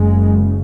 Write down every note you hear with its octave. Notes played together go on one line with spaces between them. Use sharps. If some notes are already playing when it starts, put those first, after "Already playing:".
Already playing: F#1 F#2 C#3 G#3